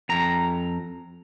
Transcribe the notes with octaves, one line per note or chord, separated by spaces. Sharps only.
F2 A#5